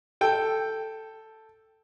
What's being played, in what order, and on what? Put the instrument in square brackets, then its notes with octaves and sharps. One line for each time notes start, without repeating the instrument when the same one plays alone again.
[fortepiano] A4 G5